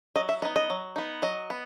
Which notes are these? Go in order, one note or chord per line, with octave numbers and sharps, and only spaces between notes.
F#3 D#5
E5
B3 D#4 D#5
D#5
F#3
B3 D#4
F#3 D#5
B3